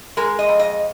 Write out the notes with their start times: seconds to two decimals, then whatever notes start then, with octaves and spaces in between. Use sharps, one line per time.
0.17 G#3 A#4
0.39 D#5
0.49 F2
0.59 D#5